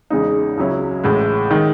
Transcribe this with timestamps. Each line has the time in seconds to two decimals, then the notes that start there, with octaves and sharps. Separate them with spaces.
0.10 E2 C#3 G#3 D#4
0.57 C#2 C#3 F#3 C#4 E4
1.04 A1 A2 G#3
1.50 D#3 G#3 D#4